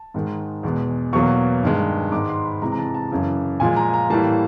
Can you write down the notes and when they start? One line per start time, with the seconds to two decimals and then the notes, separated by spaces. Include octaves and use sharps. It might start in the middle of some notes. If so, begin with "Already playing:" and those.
Already playing: A5
0.14 G#2 D#3 G#3
0.63 E2 B2 G#3
1.13 E2 B2 F#3 A#3 C#6
1.63 G2 D#3 G#3
2.12 G#2 D#3 G#3 D6
2.29 C6
2.45 B5
2.62 C3 E3 G#3 A#5
2.72 A#5
2.78 A5
2.94 A5
3.11 F#2 C#3 E3
3.60 A#2 F3 G#3 G#5
3.77 A#5
3.94 A#5
4.10 A2 E3 G3 A#3 A5